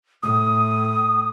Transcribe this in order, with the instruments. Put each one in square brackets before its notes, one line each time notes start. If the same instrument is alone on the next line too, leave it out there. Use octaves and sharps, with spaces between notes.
[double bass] A2 [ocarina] D#6